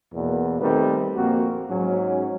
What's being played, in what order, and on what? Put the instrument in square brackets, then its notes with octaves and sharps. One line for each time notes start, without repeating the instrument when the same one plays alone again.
[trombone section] E2 B2 A#3
D#3 G3 A3 C4 D#4 B4
A#1 F2 A#3 C4 F#4
G#2 F#3 C#4